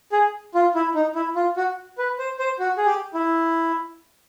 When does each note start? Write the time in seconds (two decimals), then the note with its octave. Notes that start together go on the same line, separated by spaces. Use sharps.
0.12 G#4
0.55 F4
0.75 E4
0.95 D#4
1.15 E4
1.35 F4
1.57 F#4
1.98 B4
2.19 C5
2.39 C5
2.59 F#4
2.78 G#4
2.86 G4
3.14 E4